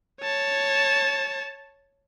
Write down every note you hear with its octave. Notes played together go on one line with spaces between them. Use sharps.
C#5 A5